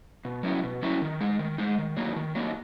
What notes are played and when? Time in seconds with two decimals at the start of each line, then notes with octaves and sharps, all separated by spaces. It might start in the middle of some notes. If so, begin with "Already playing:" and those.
0.25 B2
0.43 F#3 C#4 E4
0.63 B2
0.82 F#3 C#4 E4
1.02 D#3
1.21 G#3 D#4
1.39 D#3
1.58 G#3 D#4
1.78 D#3
1.97 F#3 A#3 D#4
2.16 D#3
2.35 F#3 A#3 D#4